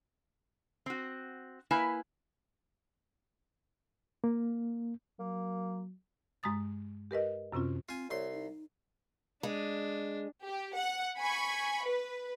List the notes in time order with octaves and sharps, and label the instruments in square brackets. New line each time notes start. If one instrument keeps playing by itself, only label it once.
[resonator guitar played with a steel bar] C4 F#4
A#3 E4 B4 G#5
[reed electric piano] A#3
[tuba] F#3 [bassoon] A#3
[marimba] G2 G#3 A#5 D#6 A6
G4 A#4 B4 D#5
F#2 C3 C4 C#4 F4
[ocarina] C4 [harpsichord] F4 G#5
[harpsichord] C2 C6 [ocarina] C#5
[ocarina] D#4
[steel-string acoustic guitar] G#3 [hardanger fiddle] D4
[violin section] G4
F#5
G#5 B5 C#6
B4